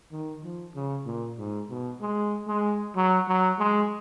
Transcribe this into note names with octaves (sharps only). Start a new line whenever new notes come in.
D#3
F3
C#3
A#2
G#2
B2
G#3
G#3
F#3
F#3
G#3